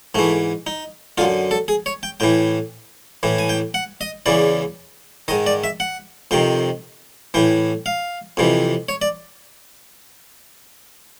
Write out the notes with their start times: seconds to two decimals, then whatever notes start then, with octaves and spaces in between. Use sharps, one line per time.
0.15 G#2 E3 A3
0.67 D#4
1.18 F#2 D3 F4
1.51 A4
1.68 G#4
1.86 C#5
2.03 G5
2.20 A2 E3 G5
3.23 A2 E3
3.39 G#5
3.49 G5
3.74 F#5
4.01 D#5
4.26 E2 C#3 E3 D5
5.28 D#3 D#5
5.31 G#2
5.46 D5
5.64 E5
5.80 F#5
6.31 F2 C3 D#3 G5
7.34 A2 E3 G5
7.86 F5
8.37 F2 C3 E3
8.89 C#5
9.02 D5